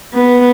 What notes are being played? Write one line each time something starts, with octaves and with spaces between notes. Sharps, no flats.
B3